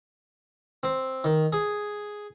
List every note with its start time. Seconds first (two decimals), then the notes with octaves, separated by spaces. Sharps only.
0.83 C4
1.24 D#3
1.52 G#4